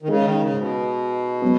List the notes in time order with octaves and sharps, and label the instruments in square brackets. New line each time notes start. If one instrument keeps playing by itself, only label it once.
[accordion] D#3
[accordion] C#3 [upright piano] G#3 D#4 G#4 D#5
[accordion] D#3
C#3
G#2
B2
[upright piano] F#3 B3